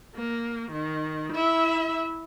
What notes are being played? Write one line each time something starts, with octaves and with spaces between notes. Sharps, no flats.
A#3
D#3
E4 E5